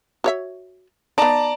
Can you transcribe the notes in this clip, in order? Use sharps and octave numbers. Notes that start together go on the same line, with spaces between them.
F#4 C#5 E5
B3 D#4 D5 A5 A#5